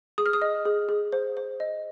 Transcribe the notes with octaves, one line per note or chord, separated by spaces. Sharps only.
G#4 D#6
F6
D#6
D#5
G#4
G#4
C5
C5
D#5